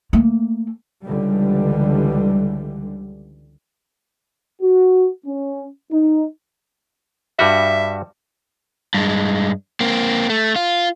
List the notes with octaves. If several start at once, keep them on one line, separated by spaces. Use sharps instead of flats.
A3 A#3
C#2 D3 E3 G3
F#4
C#4
D#4
G2 G3 F#4 E5
G2 G#3
A#3 C4
A3
F4